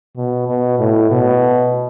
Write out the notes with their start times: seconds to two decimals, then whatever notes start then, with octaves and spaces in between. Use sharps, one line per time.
0.17 B2
0.48 B2
0.79 A2
1.11 B2